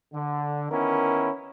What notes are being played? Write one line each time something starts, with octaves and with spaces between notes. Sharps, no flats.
D3
D#3 B3 C#4 E4 A#4